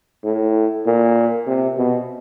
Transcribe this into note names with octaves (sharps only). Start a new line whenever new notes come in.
A2
A#2
C3
B2